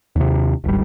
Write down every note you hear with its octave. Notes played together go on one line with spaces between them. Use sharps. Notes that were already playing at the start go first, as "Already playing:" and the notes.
D#2 C3
D1 G#1 G3